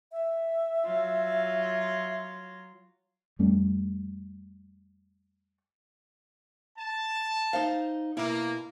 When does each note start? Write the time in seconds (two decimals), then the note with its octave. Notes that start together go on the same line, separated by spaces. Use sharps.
0.12 E5
0.85 F#3 F4
3.39 F2 G3 A3 C#4
6.77 A5
7.53 D#4 C5 F5
8.17 B2 A#3 E4